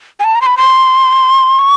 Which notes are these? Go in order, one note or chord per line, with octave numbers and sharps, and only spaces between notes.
G#5
A5
A#5
C6
B5
C6
C#6